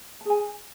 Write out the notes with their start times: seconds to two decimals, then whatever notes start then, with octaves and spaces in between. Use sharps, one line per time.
0.21 A5
0.25 G#4
0.30 G#5